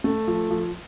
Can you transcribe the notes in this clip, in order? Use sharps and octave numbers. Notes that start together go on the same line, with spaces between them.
A3
F3
F3